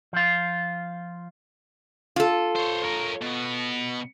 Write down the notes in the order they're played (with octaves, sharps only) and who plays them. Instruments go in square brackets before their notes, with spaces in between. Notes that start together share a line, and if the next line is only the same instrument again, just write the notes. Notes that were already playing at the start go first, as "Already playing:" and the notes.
[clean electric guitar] F3 F4
[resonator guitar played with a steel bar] F4 A4
[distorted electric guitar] C5 C#5
A#4 C#5
B2 B3